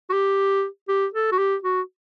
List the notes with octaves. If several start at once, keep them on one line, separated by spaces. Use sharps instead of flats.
F#4
G4
G4
A4
F#4
G4
F#4